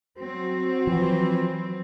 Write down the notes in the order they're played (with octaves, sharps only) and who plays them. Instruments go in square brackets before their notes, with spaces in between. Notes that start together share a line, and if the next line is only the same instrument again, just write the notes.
[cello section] F#3 C4 [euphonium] F#4
[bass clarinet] E3 [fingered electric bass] F3